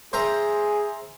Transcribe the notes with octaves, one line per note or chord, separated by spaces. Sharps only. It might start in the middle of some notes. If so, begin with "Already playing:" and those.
G#4 C5 E5 A#5